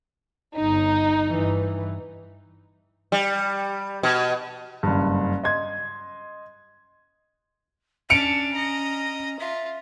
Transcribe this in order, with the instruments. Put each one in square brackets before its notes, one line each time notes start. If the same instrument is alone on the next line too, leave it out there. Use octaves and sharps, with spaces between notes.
[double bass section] G1 [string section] D#4
[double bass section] G2 E3
[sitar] G3
B2
[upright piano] F#1 G2
D#5 C6 G#6
[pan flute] C#4 [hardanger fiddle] D4 [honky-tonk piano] C#7 D7 F7
[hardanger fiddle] D#5 A#5
[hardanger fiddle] F4 [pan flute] E5